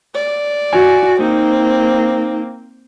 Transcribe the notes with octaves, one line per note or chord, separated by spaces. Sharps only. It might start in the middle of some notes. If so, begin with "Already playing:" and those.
D5
F#4 G#5
A#3 C4 D#4